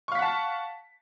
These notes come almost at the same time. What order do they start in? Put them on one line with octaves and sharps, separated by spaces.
C#6 F5 B6 F#5 A5